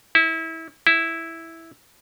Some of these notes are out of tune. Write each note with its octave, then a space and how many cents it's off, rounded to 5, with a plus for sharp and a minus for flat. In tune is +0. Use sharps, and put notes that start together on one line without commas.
E4 -25
E4 -5